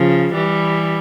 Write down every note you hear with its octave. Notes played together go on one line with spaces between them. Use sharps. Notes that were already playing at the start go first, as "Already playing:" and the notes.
Already playing: C#3 F3
E3 G3